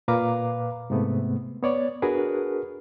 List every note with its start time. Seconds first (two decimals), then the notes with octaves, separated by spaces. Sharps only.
0.08 A#2 B4 F5 A#5 D6
0.90 G#2 C3 A3 B3
1.63 B3 C#5 D5
2.02 D4 F#4 G#4 A#4 B4